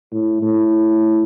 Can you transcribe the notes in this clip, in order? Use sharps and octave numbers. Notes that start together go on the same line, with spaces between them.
A2
A2